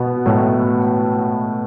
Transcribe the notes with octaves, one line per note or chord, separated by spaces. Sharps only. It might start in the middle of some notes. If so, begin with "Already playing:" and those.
Already playing: B2 B3
A2 A3